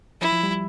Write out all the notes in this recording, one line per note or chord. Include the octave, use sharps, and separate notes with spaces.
F3 E4
F3
G3